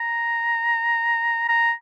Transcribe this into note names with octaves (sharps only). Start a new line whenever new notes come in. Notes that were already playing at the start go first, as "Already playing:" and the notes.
Already playing: A#5
A#5